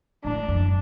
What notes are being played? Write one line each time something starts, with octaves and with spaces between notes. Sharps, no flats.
A2 D4
F#2